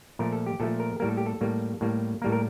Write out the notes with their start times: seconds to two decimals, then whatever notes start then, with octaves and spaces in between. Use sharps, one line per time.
0.19 A#2 F3 A3 A#4
0.32 A4
0.46 G4
0.60 A#2 F3 A3 A4
0.80 A#4
1.00 A2 G3 A#3 A#4
1.09 A4
1.17 G4
1.26 A4
1.41 A2 G3 A#3
1.81 A2 G3 A#3
2.22 A2 G3 A#3 A#4
2.32 A#4